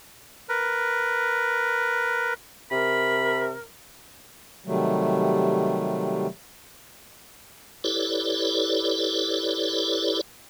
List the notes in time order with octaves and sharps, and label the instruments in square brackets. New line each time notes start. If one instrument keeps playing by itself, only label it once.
[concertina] A#4 B4
[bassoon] C3 [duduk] A#4 [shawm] B5
[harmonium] C3 D#3 F#3 G3 A3
[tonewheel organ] E4 G4 A4 B4 C#5 D5